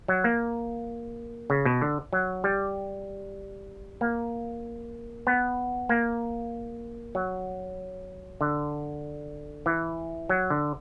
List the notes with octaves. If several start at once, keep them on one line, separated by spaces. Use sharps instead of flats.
F#3
A#3
C#3
B2
D3
F#3
G3
A#3
B3
A#3
F#3
D3
E3
F#3
D3